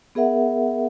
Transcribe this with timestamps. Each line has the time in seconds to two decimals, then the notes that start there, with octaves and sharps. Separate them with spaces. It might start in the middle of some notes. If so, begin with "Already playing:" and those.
0.15 B3 G#4 A#4 E5 F#5